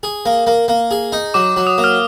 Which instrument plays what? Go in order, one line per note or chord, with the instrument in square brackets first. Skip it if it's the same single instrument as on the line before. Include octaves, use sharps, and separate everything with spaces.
[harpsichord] G#4
A#3
A#3
A#3
G#4
D#4
[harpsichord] F#3 [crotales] D6
[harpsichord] F#3
[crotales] D#6
[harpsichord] A#3
[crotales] F6